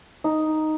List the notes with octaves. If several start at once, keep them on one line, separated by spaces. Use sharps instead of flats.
D#4